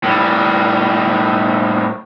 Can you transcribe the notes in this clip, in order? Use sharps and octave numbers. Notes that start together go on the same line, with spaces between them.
A2 G3